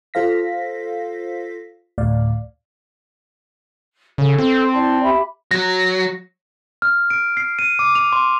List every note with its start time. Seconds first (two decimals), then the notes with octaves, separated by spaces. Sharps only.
0.14 F4 A4 C5 F5 A#6 B6
1.98 D2 A2 D5 F5
4.18 C#3 A4
4.39 C4
4.73 E4 D5 A5
5.03 G4 E5 B5
5.51 F#3 A#6
6.82 F6
7.10 D7
7.37 C7
7.59 D#7
7.79 D6
7.95 F7
8.12 C6